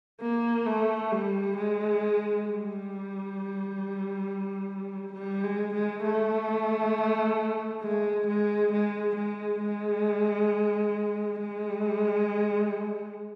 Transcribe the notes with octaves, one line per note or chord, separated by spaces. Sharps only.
A#3
A3
G3
G#3
G3
G3
G#3
G#3
A3
G#3
G#3
G#3
G#3
G#3
G#3